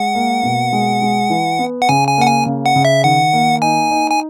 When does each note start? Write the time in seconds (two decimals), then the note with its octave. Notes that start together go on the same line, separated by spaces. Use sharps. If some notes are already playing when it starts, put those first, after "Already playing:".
Already playing: G#3 F#5
0.15 A#3
0.43 B2
0.73 G#3
1.02 G#3
1.30 E3
1.59 B3
1.82 F#5
1.89 C#3 G#5
2.08 G#5
2.17 A#3 F#5
2.27 G#5
2.46 C#3
2.66 F#5
2.76 C#3
2.85 E5
3.04 D#3 F#5
3.33 A#3
3.62 D#4 G#5
3.91 D#4
4.11 G#5